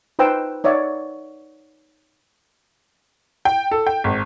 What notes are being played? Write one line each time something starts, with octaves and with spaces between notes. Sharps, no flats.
D#4 B4 C5 G5 E6
D#4 C#5 D5 E5 F#5
G5
A4
G5
G#1